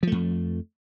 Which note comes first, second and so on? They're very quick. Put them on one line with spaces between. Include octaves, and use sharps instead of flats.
F3 A3 F2